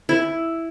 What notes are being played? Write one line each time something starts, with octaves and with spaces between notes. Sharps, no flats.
E4